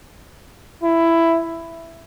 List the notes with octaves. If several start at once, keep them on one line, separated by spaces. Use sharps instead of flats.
E4